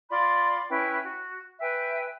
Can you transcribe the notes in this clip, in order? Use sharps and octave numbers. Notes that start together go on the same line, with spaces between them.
F4 D5 B5 C6
C#4 E4 B4 G5
F#4
B4 E5 G5 G#5